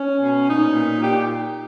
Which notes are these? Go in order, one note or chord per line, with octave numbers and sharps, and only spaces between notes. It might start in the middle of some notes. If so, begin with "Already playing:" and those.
Already playing: C#4
B2
A#2 D#4
A#2
A#2 G4